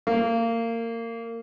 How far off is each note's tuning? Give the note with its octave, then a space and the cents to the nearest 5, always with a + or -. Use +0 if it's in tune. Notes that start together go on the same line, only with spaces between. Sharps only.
A#3 -25